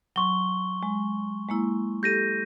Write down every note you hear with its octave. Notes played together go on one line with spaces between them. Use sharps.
F#3 C6 C#6 G7
G#3
G#3 A#3 E4
G4 A4 G6 A#6 D#7